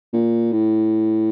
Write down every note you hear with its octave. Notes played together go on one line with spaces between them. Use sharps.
A#2
A2